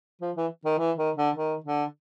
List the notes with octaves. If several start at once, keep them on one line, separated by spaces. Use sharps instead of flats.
F3
E3
D#3
E3
D#3
D3
D#3
D3